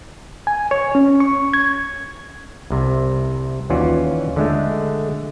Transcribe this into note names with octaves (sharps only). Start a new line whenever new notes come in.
G#5
C#5
C#4
C#6
G#6
C2 C3
D#2 E3 C#4 F4 F#4 D5
D3 G#3 A3